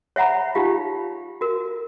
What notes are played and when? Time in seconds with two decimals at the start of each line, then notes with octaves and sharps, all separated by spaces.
0.16 C#5 E5 F#5 A#5 B5
0.55 D#4 F4 G4 F5
1.41 F#4 A#4